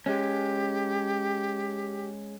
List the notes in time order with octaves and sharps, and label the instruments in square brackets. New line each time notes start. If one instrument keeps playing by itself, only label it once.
[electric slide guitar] G#3 C#4 [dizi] G4